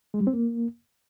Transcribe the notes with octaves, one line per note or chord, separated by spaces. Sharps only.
G#3
G3
C4
A#3